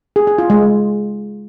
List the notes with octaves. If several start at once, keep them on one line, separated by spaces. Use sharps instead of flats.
G#4
G#4
F4
G#3